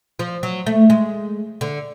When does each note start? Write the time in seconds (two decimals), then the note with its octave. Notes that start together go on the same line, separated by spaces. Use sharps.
0.19 F3
0.43 F#3
0.67 A3
0.90 G#3
1.61 D3